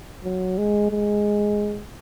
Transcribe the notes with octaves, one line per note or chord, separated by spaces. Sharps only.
F#3
G#3
G#3